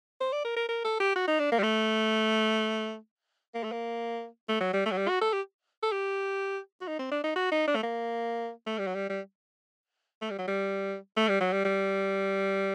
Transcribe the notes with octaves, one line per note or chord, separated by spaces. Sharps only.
C5
D5
A#4
A#4
A#4
A4
G4
F#4
D#4
D4
A#3
G3
A3
A#3
A3
A#3
A3
F#3
G3
A3
F#3
G3
F#4
A4
G4
A4
G4
F#4
D#4
C4
D4
D#4
F#4
D#4
D4
A3
A#3
A3
G3
F#3
G3
G3
A3
G3
F#3
G3
A3
G3
F#3
G3
G3